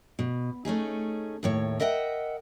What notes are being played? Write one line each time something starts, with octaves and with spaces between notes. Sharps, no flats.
B2
A3 C#4 D#4 G#4
D#2 A2 C#5
A#4 D#5 E5 F#5 G5